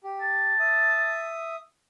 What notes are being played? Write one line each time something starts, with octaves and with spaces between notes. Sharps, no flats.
G4
A5
E5 D#6